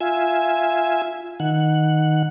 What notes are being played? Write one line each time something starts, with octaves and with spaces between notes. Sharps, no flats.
F4 E5 G#5
D#3 F#5